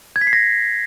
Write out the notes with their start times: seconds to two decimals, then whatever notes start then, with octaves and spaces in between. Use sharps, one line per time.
0.16 G#6
0.21 B6
0.27 C7
0.33 A#6